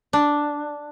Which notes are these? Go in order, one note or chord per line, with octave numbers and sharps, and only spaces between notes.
D4